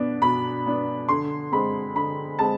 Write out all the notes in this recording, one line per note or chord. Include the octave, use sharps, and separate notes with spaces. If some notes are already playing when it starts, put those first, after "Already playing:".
Already playing: B2 B3 D4
B2 B5
B3 D4
D3 C6
G#3 C4 B5
D3 B5
G#3 C4 A5